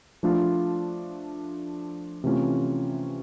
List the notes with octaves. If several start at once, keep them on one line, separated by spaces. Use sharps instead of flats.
F3 A3 D4 F4
C3 E3 A3 C#4 F4